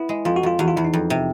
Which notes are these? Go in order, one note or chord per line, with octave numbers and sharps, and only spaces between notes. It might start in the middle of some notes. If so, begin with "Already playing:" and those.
Already playing: B3 E4
G#3
F2 F4
F#4
F2 F4
E2 F#4
F4
E2 E4
D#4
F2
C3